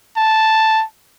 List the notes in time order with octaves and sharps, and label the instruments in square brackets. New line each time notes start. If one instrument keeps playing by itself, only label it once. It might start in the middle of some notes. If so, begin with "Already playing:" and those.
[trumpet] A5